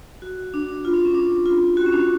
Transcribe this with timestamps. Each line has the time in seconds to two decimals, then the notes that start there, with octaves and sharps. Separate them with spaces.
0.22 F#4
0.54 D4
0.69 D4
0.85 F4
0.94 D4
1.05 C#4
1.15 D4
1.46 F4
1.77 F#4
1.86 C#4
1.92 D4